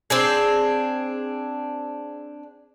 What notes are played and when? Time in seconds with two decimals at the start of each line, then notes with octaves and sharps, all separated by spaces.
0.10 C4 D4 G#4